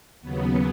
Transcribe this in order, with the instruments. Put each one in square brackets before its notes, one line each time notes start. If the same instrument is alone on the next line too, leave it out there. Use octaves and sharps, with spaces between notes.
[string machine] D#2 C#3 F#3 B3